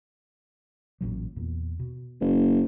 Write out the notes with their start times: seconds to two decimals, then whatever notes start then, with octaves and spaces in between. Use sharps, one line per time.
1.01 A1 A#2 F#3
1.36 E2 A#2
1.80 B2
2.20 F#1